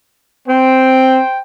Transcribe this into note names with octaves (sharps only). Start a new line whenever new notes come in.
C4 C5 G5